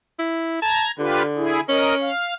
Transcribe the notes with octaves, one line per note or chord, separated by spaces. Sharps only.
E4
A5 A#5 G#6
D3 F4 G4 B4
E4 G#4
C#4 A#4 D#5
F5